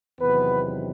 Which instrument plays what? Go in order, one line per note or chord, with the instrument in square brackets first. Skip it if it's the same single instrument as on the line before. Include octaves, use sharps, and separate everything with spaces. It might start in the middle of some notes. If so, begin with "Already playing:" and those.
[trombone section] E2 C3 D#3 F#3 B3 B4